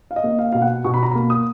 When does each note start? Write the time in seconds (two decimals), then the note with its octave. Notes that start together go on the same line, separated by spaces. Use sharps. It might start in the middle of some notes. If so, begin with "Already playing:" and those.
0.11 F5
0.16 D#5
0.24 A#3
0.39 F5
0.52 B2 F5
0.62 F#5
0.84 B2 C#6
0.94 B5
1.03 A#5
1.12 A#3 B5
1.30 D#6